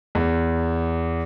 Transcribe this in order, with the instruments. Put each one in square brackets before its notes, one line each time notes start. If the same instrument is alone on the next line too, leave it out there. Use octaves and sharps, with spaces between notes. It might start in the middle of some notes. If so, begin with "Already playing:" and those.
[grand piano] E2